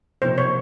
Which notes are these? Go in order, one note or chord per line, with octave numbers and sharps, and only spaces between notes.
C3 F3 A#3 D#4 C5
C#5